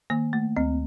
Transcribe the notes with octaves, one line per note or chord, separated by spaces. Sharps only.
D#3 A#3
A3
D2 C4